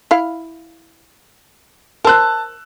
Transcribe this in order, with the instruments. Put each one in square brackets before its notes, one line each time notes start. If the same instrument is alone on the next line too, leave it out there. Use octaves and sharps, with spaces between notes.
[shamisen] E4 F5
[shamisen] A#4 C5 [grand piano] A5 E6 F#6